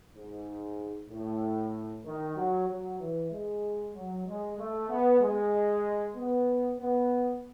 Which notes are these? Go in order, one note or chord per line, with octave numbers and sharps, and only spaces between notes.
G#2
A2
D#3
F#3
F#3
E3
G#3
F#3
G#3
A3
B3
G#3
B3
B3